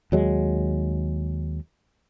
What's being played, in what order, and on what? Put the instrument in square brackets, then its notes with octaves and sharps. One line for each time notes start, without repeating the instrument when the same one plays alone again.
[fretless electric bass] D#2 F#3 G#3